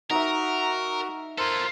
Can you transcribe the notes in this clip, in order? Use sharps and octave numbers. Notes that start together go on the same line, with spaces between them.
D#4 F#4 A#4 E5 F#5
F4 A4 A#4 C5